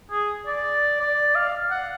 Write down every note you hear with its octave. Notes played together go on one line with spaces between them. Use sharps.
G#4
D5
D5
F5
F#5